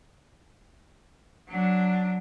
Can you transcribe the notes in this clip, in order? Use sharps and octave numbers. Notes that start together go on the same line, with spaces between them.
F#3 D4